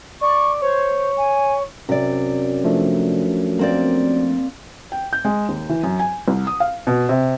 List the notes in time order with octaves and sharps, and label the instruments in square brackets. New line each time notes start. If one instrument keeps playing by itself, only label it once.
[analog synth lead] D5 [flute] C#6
[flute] C5 [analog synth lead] C#5
[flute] G#5
[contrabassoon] F#2 [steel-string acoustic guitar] C3 D5
[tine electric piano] F3 A3 D4
[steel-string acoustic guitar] A#3 C4 D5
[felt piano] G5
G6
G#3
D#2
E3
F#2
G#5
C2
D#6
F5
B2
C3